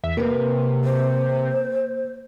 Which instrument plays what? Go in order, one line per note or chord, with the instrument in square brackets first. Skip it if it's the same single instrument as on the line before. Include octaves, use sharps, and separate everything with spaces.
[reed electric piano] E2 [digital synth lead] E5
[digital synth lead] C3 [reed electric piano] A#3 [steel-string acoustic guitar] A#4 B4
[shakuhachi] C5